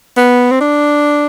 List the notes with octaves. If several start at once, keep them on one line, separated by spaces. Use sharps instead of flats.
B3
C4
D4